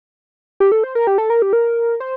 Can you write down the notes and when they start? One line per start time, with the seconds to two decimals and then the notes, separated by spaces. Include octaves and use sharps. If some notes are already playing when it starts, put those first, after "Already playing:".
0.60 G4
0.72 A4
0.84 C5
0.95 A#4
1.07 G4
1.18 A4
1.30 A#4
1.42 G4
1.53 A#4
2.00 C5